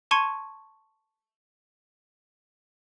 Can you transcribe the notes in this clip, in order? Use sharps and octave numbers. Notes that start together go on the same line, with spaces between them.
A5 C6 C#6 G#6 C#7 D#7